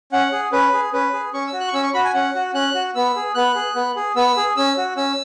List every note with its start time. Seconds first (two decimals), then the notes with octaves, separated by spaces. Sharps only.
0.12 C#4 F#5
0.32 G#4
0.52 C#4 B4
0.73 G#4
0.93 C#4 B4
1.13 G#4
1.33 C#4 C#6
1.47 E6
1.53 F#4
1.60 F#6
1.68 C#6
1.73 C#4 E6
1.83 C#6
1.94 F#4 B5
2.05 G#5
2.14 C#4 F#5
2.35 F#4
2.54 C#4 F#6
2.74 F#4
2.95 B3 E6
3.16 G#4
3.35 B3 F#6
3.55 G#4
3.75 B3
3.96 G#4
4.16 B3 E6
4.37 G#4
4.56 C#4 E6
4.77 F#4
4.97 C#4 E6